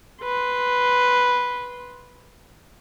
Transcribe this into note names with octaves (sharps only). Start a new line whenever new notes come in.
B4 C6